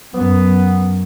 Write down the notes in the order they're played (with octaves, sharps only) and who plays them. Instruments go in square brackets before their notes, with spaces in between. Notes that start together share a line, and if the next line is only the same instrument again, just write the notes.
[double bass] F#2 [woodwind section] B3